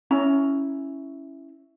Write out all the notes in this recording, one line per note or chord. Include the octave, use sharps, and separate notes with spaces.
C#4 E4 A#5